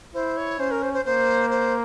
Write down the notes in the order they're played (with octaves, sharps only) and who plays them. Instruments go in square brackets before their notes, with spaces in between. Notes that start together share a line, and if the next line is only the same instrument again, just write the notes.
[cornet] E4 [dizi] C5
[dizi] C#5
[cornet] C#4 [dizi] C5
[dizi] A#4
C5
C5
[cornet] A#3 [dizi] C5
[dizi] C5